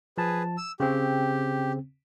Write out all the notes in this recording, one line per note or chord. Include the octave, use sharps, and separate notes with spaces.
F3 G#4 B4 A5
E6
C#3 C4 G4